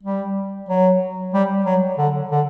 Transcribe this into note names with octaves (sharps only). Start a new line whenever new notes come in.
G3
F#3
G3
F#3
D3
D3